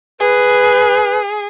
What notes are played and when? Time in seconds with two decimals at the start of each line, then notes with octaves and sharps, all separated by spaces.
0.20 G#4 B4